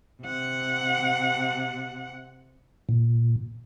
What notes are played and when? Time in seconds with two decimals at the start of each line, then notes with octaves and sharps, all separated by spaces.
0.21 C3 F#5
2.89 A#2